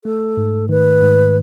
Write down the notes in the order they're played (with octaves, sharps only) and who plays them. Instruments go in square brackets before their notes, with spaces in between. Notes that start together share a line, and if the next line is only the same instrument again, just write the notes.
[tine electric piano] A3 [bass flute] A4
[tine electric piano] G#2
[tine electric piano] D#3 [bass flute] B4
[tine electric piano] G#2